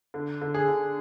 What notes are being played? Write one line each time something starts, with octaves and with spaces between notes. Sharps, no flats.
D3
D3
G#4
D3